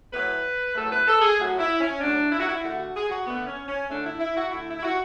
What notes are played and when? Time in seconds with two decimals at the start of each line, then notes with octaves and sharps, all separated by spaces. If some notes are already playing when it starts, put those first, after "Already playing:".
0.12 A2 F#3 A3 B4
0.75 A2 F#3 A3 A4
0.90 B4
1.07 A4
1.22 G#4
1.38 A2 F#3 A3 F#4
1.59 E4
1.80 C#4
2.00 A2 F#3 A3 D4
2.32 E4
2.40 F#4
2.48 E4
2.63 D3 A3 F#4
2.78 F#4
2.95 G#4
3.10 F#4
3.25 D3 A3 B3
3.46 C#4
3.67 C#4
3.88 D3 A3 D4
4.05 E4
4.20 E4
4.36 F#4
4.51 D3 A3 E4
4.68 E4
4.79 E4
4.83 F#4